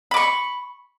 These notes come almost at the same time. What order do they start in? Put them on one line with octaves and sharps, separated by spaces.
B5 D6 C#6